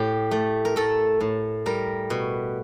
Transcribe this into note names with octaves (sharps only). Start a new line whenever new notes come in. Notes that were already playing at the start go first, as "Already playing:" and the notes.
Already playing: A2 G4
A3
A#4
A3 A4
A2
G3 A#4
B2